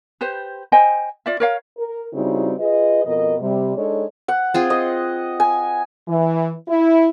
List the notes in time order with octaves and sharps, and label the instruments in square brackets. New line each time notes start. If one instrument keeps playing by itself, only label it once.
[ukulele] G4 B4 C5
C5 D#5 G5 G#5
F4 D5 E5
A#4 C#5 F5
[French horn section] A#4
C#3 G3 C4 D#4 E4 F#4
F4 G#4 B4 D#5
F2 B2 A#4 D#5
C3 G3
G#3 D4 D#4 A4 C#5
[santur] F#5
[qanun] C4 F4 G#4
[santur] D#5
G#5
[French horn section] E3
E4